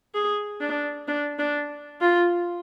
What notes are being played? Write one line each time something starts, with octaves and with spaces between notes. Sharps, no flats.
G#4
D4
D4
D4
F4